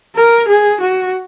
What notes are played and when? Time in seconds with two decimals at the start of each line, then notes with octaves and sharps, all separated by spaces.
0.16 A#4
0.48 G#4
0.81 F#4